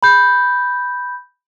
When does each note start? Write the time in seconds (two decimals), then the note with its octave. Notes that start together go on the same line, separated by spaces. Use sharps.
0.03 B5 G6